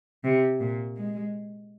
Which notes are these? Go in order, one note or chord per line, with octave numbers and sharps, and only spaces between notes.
C3
A#2
G#3